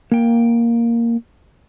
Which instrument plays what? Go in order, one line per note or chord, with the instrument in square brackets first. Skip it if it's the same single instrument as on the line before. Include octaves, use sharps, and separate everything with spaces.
[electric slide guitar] A#3 G5